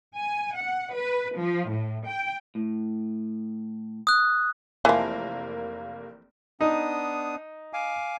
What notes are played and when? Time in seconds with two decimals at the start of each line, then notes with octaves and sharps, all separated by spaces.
0.15 G#5
0.57 F#5
0.95 B4
1.38 F3
1.69 A2
2.08 G5
2.55 A2
4.07 D#6 F#6
4.85 F1 E3 F3 A#3 A#4
6.61 B3 D4 D#4 D#6
7.73 F5 G#5 D6